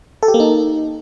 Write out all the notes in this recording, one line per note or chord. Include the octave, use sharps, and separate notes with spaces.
A4
G4
A#3
D#4